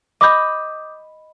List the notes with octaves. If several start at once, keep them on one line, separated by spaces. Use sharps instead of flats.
D#5 B5 D6 D#6 G6